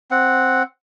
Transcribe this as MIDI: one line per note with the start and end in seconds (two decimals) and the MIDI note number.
0.11 0.63 60
0.11 0.63 78